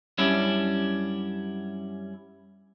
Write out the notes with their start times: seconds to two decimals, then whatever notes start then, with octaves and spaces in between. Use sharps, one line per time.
0.18 F#2 G3 C#4 D4 E4